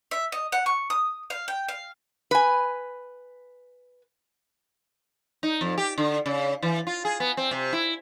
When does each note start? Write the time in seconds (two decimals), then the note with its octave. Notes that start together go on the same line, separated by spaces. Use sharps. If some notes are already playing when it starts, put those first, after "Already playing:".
0.11 E5
0.32 D#5
0.52 F#5
0.66 C#6
0.90 D#6
1.30 F5
1.48 G5
1.68 F5
2.31 B4 G#5
5.43 D#4
5.61 F2
5.78 G4
5.98 D3
6.26 C#3
6.63 E3
6.87 F4
7.05 G#4
7.20 B3
7.37 C4
7.51 C3
7.73 E4